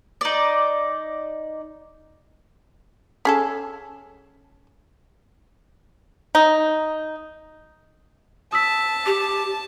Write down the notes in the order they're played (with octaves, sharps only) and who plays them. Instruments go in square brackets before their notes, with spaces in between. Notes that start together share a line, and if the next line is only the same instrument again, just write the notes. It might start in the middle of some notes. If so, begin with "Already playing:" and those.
[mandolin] D#4 D5
[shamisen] C#4 G#4 A4
[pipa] D#4
[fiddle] A5 [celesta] D#6 E6 B6
[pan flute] G4